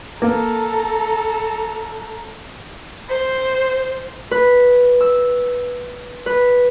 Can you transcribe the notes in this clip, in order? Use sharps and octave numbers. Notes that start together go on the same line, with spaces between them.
A#3 A4 A#5
C5
B4
E6
B4